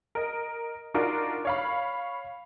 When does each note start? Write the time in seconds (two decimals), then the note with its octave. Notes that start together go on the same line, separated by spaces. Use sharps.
0.15 A#4 D#5
0.94 D4 D#4 F4 F#4 A#4
1.45 C#5 F5 B5